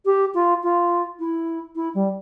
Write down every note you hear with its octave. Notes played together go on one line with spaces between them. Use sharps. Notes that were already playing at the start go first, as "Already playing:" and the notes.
G4
F4
F4
E4
E4
G3